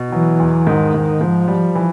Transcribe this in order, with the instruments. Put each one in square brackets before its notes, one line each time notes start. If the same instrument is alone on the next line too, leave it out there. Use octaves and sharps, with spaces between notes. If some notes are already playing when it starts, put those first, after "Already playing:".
Already playing: [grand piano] B2
[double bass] E3 [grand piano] F#3
[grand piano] E2
[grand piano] G#2 [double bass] D#3
[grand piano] G#2
[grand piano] G#2 [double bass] F3
[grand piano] G3
E3